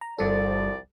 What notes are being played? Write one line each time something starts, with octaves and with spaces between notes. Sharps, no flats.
A#5
G1 C2 F3 G3 A4 D5